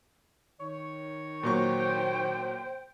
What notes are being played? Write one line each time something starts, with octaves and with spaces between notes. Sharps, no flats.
D#3 C#5
A#2 F#3 C5 G5 C#6